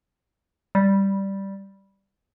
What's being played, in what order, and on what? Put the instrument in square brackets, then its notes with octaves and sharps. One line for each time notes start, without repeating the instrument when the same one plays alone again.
[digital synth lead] G3